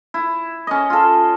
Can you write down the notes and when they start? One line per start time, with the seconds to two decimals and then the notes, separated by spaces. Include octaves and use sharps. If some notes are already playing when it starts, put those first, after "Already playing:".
0.14 E4
0.67 C#4 D#5
0.90 F4 A4